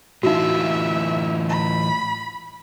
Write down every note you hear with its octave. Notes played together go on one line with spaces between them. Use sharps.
A2 E3 D#4 F4 F#4 E5
B5